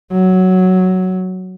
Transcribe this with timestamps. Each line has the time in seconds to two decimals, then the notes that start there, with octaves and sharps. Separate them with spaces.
0.12 F#3